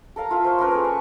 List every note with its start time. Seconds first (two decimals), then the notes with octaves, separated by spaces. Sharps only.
0.16 A4 A#4 F5 A#5
0.31 F4 E5
0.44 C5 C#5 A5
0.58 A#3 C#4 A#4 B4
0.71 G#3 A4
0.84 C#6